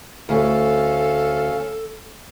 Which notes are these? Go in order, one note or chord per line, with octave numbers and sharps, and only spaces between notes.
D2 C#4 A4 F5